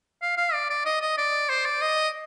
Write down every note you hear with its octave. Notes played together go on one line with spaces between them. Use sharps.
F5
F5
D5
D5
D#5
D#5
D5
C5
D5
D#5